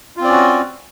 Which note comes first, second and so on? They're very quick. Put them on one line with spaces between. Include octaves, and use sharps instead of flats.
F4 C4 D5 C#4 F#4